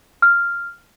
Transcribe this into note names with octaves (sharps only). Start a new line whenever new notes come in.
F6